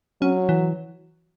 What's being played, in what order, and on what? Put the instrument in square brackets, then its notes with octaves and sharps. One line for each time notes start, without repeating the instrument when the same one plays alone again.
[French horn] F#3 [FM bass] C#4
[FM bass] E3